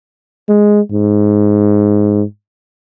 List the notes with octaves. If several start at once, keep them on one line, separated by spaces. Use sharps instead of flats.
G#3
G#2